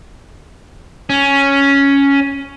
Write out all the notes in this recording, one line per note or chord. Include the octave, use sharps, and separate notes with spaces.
C#4